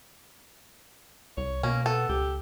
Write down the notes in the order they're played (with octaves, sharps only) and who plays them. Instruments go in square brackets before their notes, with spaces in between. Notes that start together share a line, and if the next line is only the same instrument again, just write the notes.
[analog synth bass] C2 [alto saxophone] C#5
[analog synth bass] B2 [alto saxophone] A#3 [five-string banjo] C#4
[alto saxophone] B3 [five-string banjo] A4
[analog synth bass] C#2 [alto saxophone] G4